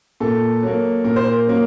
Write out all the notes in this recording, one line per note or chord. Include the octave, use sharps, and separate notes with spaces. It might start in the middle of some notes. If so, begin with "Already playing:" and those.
A#2 A4
F#3 A#3
A#2 A#4
C5
A#4
F#3 A#3